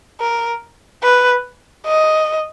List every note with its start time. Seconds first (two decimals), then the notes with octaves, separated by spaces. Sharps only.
0.20 A#4
1.03 B4
1.86 D#5